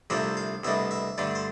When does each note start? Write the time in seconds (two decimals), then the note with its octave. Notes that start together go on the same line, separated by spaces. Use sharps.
0.10 C2 C3 F3 A3 D4 E5
0.37 F5
0.64 C2 B2 A3 D4 E5
0.91 E5
1.18 G2 D3 A3 D4 D5
1.35 C5